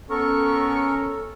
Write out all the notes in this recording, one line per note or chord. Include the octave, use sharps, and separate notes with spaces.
B3 C#4 A4 A#4 C#6